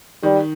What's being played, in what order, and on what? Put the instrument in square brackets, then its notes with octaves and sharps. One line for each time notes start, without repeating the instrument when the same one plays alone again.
[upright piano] D#3 [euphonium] G3